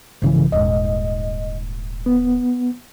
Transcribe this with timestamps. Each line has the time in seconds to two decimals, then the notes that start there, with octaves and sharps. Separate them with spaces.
0.22 B1 G#2 C#3 E3 F3
0.52 D#1 G#2 D#5
2.06 B3